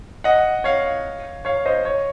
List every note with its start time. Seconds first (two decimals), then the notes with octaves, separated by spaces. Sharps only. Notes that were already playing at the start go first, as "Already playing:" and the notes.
0.24 D#5 F#5
0.64 C#5 F5
1.45 C#5 F5
1.65 C5 D#5
1.85 C#5